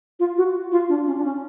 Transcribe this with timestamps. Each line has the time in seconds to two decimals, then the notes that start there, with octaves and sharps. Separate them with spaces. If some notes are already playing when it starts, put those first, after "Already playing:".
0.20 F4
0.37 F#4
0.72 F4
0.89 D4
1.07 C#4
1.17 D4
1.24 C#4